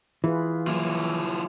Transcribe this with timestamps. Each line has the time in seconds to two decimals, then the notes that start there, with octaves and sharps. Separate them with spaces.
0.24 E3 F4 G#4 B4
0.67 F3 F#3 A#3 E4